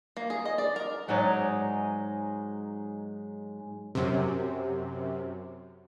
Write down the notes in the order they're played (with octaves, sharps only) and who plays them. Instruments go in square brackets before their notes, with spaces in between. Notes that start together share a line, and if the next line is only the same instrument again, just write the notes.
[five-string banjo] A#3
G#4
D#5
D5
A#4
[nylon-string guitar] G#2 F#3 G#3 D#4 C#5 D5
[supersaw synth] F#2 C3